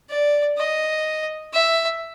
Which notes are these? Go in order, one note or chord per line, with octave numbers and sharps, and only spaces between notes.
D5
D#5
E5